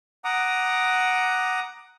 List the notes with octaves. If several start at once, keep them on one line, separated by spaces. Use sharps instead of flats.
F#5 A#5 D6 D#6